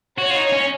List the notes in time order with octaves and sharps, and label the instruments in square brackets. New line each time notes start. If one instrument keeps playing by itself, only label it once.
[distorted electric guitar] F#4 [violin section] C#5
[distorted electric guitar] F4
D#4
C#4